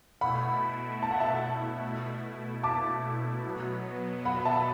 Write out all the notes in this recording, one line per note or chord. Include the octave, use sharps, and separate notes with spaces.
B2 A3 E4 F#5 B5
A5
F#5
E5 A5
A5 D6
B2 F#3 B3
F#5 B5
E5 A5